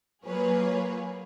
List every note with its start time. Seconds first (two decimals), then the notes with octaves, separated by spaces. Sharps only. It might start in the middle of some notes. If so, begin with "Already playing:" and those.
0.25 F#3 A#3 F4 G#4 B4 C#5